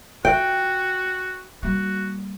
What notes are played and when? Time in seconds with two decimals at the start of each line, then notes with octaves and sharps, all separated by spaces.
0.25 F4 F#4 G5
1.63 G3 A#3 F#4